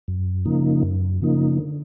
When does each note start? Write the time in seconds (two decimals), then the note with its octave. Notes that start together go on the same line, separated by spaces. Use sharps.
0.08 F#2
0.45 C#3 F3 A#3 D#4
0.83 F#2
1.22 C#3 F3 A#3 D#4
1.59 D3